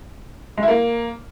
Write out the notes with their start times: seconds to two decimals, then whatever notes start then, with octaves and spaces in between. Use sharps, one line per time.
0.57 G#3
0.63 E4
0.68 A#3